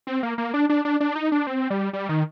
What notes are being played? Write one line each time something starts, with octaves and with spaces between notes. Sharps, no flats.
C4
A#3
A#3
D4
D4
D4
D4
D#4
D4
C4
G3
G3
D#3